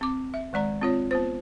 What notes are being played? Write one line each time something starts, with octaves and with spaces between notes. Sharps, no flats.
C4 D6
E5
D#3 G#3 D5 A#5
C4 F4 C#5
B3 F4 C5